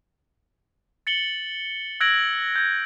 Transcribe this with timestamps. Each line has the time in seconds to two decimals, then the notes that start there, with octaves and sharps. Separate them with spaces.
1.07 A6 C#7 F#7 G7
2.00 E6 F#6 G#6 A#6 D7 F#7
2.56 G6 G#6